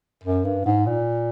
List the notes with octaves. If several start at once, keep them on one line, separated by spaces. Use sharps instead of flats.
F#2
G2
G#2
A#2